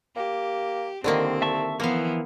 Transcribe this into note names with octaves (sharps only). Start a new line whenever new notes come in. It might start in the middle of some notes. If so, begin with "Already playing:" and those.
A#3 G4
C2 D3 D#3 A#3 C4
E5 A5 C#6
E3 F3 A#3 B3 F5